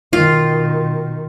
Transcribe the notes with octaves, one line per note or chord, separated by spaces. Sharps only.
B2 D#3 F4